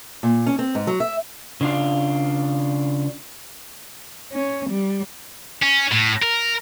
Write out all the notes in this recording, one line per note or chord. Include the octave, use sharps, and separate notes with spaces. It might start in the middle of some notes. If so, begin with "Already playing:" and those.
A#2
C#4
C4
G#2
F#3
E5
C#3 D4 F4
C#4
G3
C#4
A2
A#4